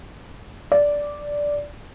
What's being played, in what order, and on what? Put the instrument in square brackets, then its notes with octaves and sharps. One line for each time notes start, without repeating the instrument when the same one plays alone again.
[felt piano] D5